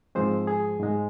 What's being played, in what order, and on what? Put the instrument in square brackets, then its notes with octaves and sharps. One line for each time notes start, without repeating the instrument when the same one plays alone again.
[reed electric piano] G#2 F3 G#3 C4 C5
G#4
G#2 G#3